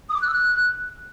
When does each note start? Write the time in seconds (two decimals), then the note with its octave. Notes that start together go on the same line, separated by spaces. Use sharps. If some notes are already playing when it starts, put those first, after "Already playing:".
0.09 D#6
0.15 D6
0.21 F#6
0.27 E6
0.32 F#6